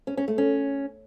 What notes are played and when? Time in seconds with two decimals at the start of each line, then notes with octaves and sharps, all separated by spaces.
0.07 C#4
0.17 C#4
0.28 A3
0.38 C#4